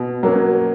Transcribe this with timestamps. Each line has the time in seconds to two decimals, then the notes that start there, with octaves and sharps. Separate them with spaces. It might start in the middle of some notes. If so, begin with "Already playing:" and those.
Already playing: B2
0.23 F#3 A#3 C#4